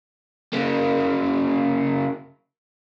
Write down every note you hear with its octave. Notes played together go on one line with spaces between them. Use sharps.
C#3 A#3